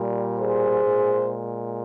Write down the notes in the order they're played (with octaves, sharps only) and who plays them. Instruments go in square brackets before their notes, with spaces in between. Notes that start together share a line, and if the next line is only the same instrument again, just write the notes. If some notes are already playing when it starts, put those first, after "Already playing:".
Already playing: [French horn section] A#2 G3
G#4 C5
A#2 G#3